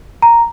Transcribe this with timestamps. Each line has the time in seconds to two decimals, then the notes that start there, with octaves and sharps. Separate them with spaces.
0.22 A#5